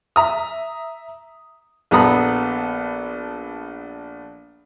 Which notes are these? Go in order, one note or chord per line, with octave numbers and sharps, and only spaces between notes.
E5 A#5 D#6
A#1 B3 A4 A#5 B5 D#6